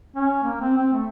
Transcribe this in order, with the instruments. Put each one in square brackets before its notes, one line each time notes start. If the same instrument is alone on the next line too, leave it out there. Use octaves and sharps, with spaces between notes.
[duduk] C#4
A#3
C4
C4
A3